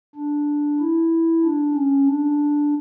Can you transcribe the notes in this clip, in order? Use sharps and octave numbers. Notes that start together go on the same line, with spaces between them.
D4
E4
D4
C#4
D4